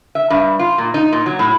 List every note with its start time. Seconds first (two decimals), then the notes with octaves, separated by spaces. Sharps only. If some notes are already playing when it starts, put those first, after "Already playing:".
0.15 E5
0.30 G2
0.59 F4
0.78 A#2
0.94 D#4
1.13 A#2
1.26 F#3
1.39 A2